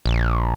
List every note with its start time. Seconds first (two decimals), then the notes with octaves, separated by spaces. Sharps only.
0.06 A#1